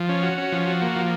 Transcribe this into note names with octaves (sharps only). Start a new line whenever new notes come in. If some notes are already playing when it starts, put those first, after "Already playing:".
Already playing: F3
C#4
F#4
C#4
F3
F#4
A#3
F3